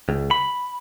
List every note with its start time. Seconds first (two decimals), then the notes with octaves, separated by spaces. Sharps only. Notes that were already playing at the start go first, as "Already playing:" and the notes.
0.09 C#2
0.31 B5